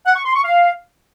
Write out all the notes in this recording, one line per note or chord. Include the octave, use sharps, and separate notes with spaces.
F#5
C#6
C6
C#6
F5